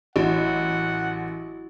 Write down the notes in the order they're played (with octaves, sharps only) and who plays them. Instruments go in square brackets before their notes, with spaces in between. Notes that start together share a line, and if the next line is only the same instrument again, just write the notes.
[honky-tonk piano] A1 [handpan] E4 F#4 [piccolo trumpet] F#5